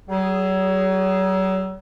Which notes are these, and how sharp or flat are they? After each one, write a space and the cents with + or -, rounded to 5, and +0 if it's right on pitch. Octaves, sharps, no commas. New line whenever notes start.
F#3 +40 G#4 +0